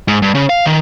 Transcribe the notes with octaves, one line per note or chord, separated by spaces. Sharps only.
G#2
G2
C#3
F5
D#3